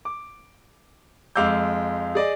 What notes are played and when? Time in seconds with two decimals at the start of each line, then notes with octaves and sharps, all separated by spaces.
0.05 D6
1.36 F2 G#3 F5 D6 E6 G6
2.15 G#4 D5 D#5